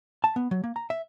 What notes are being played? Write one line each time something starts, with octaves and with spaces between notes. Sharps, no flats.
A5
B3
F#3
A#3
A#5
E5